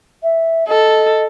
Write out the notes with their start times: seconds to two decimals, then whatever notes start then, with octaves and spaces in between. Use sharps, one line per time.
0.23 E5
0.69 A4 D#5